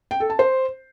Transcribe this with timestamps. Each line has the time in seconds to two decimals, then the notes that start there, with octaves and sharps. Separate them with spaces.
0.11 G5
0.20 A4
0.30 A5
0.39 C5